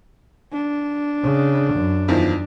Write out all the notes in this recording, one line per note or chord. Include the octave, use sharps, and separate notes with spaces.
D4
C#3
F#2
E2 D#3 F3